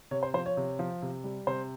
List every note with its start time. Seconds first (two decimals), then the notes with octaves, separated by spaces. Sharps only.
0.11 C3 C#5
0.23 C5
0.34 F3 C5
0.46 C#5
0.57 C3
0.79 F3
1.02 C3
1.24 G3
1.47 C3 C5